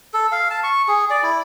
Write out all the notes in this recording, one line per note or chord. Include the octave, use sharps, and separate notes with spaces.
A4
F5
A5
C#6
G#4
D5
E4